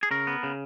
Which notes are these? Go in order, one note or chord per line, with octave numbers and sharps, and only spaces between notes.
G#4
C#3 A#4
B3
C#3